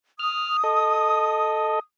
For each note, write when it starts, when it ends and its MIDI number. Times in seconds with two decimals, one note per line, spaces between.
0.19 1.80 87
0.19 0.57 89
0.64 1.79 69
0.64 1.79 75